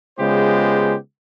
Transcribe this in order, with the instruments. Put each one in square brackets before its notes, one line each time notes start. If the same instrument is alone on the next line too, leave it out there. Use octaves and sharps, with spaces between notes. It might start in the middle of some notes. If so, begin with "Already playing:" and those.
[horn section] C#3 G#3 B3 F4 G4 C5